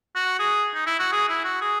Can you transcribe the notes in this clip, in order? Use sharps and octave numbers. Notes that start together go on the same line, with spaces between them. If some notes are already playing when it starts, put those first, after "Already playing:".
F#4
G#4
D#4
E4
F#4
G#4
E4
F#4
G#4